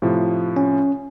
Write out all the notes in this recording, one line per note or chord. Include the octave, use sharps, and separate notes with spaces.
A2 C3 F3
C#4